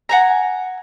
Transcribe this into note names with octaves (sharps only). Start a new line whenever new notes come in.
F#5 G#5 A#5